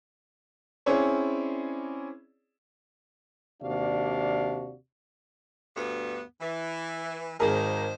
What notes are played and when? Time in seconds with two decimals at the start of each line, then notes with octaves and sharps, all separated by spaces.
0.86 C4 C#4 E4 G#4 C#5 D5
3.63 D#2 C3 D4 F#4 D5 F5
5.76 D2 G2 B3
6.41 E3
7.40 G#1 D#3 G#4 A#4 C5